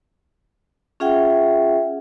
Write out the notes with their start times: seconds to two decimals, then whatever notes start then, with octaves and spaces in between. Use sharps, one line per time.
1.00 C#4 F4 G#4 E5 F#5 G5